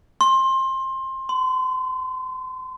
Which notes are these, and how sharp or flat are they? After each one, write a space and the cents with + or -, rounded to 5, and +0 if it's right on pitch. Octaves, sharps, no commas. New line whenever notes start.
C6 +20
C6 -35